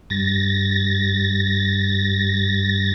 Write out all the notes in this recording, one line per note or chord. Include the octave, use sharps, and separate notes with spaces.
G2 A6 A#6